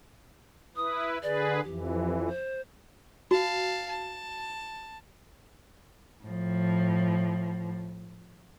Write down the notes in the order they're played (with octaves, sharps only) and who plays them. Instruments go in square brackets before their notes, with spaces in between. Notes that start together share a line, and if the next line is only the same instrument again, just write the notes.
[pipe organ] E4 B4 [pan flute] D#6
[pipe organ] D3 G#4 B4 [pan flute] D5
[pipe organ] F2 E3 [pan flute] G4
[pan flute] C5
[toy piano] F#4 [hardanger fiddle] F5 A5
[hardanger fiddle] A5
[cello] A2 F3